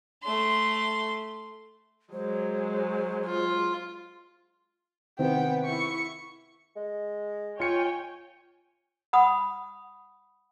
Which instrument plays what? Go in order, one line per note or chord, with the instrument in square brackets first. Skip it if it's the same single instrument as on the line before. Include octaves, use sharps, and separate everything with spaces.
[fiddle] A3 C6
[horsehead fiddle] F#3 G#3 [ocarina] C5
[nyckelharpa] F4
[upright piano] C3 D#3 C4 [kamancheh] B3 G5
[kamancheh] E4 C#6
[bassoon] G#3
[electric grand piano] F4 C#7 [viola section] C#5 G5 G#5
[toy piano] F#5 B5 D#6